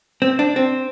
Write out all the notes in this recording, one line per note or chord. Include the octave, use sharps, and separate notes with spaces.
C4
D4
C4